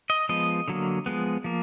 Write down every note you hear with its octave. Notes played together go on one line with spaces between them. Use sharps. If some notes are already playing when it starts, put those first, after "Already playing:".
D#5
F3 G#3 B3 D#5
D3 F#3 A#3
F3 G#3 B3
F3 A#3